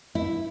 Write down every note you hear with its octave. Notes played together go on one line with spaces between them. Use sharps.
E4